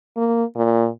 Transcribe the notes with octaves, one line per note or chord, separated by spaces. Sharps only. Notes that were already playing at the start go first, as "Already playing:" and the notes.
A#3
A#2